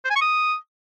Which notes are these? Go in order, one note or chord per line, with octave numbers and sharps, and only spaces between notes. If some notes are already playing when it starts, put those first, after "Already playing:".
C5
G#5
C#6
D#6